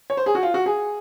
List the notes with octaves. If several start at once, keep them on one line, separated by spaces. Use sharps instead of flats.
C#5
C5
G#4
F#4
F4
F#4
G#4